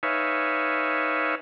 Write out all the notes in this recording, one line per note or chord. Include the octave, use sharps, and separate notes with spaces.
D#4 B4 C#5 E5 F5 G#5